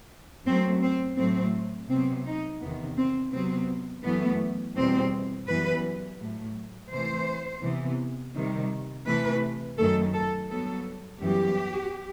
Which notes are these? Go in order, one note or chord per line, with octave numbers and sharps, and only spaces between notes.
F#2 F#3 A3 C4
C4
A2 F#3 A3 C4
C3 F#3 B3 C4
D#4
E2 C3 D#3 B3
C4
C3 F#3 B3 C4
F#2 E3 A3 B3
E2 B2 G3 C4
F#2 E3 G3 B3 B4
A2 F#3 A3
C3 E3 A3 C5
C3 E3 B3
C3 D#3 G3
C3 E3 A3 B4
F#2 D#3 A3 A4
A4
G2 F#3 B3 A4
F#2 E3 G3 B3 G4